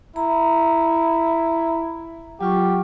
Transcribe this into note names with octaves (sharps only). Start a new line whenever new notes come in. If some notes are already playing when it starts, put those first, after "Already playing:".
E4 A#5
F#3 F4 G4 C#6